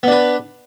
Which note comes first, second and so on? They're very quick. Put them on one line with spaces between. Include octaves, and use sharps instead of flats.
B3 D4 B4